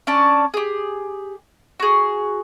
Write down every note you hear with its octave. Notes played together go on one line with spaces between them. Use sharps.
C#4 D4 D5 A5
G4 G#4
F#4 G#4